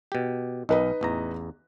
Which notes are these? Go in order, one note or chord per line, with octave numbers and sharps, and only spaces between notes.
B2 G4
B1 D#4 B4 D#5
A1 E2 A#5